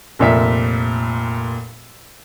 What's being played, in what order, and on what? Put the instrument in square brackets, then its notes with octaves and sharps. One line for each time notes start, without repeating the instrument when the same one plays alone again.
[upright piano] F1 A#2 E5 B6